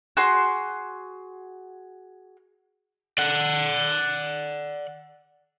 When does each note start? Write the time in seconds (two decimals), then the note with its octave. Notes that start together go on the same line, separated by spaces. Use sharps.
0.17 F#4 G#4 C6
3.18 D5 F#5